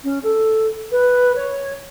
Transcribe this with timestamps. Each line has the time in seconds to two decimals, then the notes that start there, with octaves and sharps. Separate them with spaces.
0.04 C#4
0.23 A4
0.92 B4
1.36 C#5